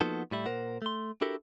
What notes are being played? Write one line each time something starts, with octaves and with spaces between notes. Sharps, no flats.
F3 A#3 B3 D#4 F#4 A4
A2 G3 E4
A#2 A#4 C5 F#5
A3 C6
D4 E4 F#4 G4 A4 A#4